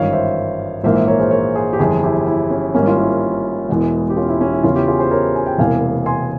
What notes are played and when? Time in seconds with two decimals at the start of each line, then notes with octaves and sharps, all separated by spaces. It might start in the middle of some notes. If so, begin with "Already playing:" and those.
Already playing: G#1 G2 E3 C#5 F5
0.12 C5 E5
0.83 A#1 G#2 E3 A#3 C5 E5
0.96 C5 E5
1.07 A#4 C#5
1.19 G#4 C5
1.31 A#4 C#5
1.55 G#4 C5
1.73 G4
1.79 G1 F2 E3 F4 G#4
2.03 E4 G4
2.26 E4
2.50 C#4
2.74 G#1 G#2 G3 A#3 C#4
2.87 F4
2.97 E4
3.69 E1 E2 E3 G#3
4.10 G4
4.17 C#4 F4
4.28 E4
4.41 C#4
4.53 E4
4.63 E2 C#3 E3 C#4 F4
4.75 E4 G4
4.87 F4 G#4
4.99 G#4 C5
5.11 A#4 C#5
5.36 G#5
5.46 G5
5.58 E1 E2 C3 E3 A#3 F5 G#5
6.06 G#5 C6